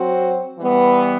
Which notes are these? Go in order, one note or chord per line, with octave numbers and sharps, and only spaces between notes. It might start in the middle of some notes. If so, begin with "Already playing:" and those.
Already playing: F#3 C4 F#4 C5
E3 G3 B3